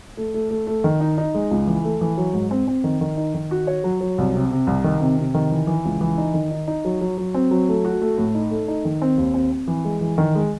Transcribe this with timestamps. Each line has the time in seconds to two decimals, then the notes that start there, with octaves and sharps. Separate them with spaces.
0.17 A3
0.34 A3
0.51 A3
0.67 A3
0.84 D#3
1.01 D#4
1.18 D#4
1.35 G#3
1.51 C#2
1.67 E3
1.84 A3
2.01 E3
2.17 F#3
2.33 G#2
2.51 C4
2.67 C4
2.84 D#3
3.01 D#3
3.17 D#4
3.34 D#3
3.51 F#4
3.67 C#5
3.84 F#3
4.01 F#3
4.18 C2
4.35 C3
4.51 C3
4.67 C2
4.84 D#3
5.01 C3
5.18 C3
5.34 D#3
5.51 E3
5.67 E3
5.85 C#2
6.01 E3
6.18 D#4
6.34 D#3
6.51 D#4
6.68 D#4
6.85 F#3
7.01 F#3
7.18 F#3
7.34 C4
7.51 F#3
7.68 A3
7.85 F#4
8.02 A3
8.18 A2
8.35 D#4
8.51 A3
8.68 D#4
8.85 D#3
9.02 C4
9.17 D#2
9.34 C4
9.52 C4
9.67 E3
9.85 G#3
10.01 E3
10.18 D#3
10.35 G#3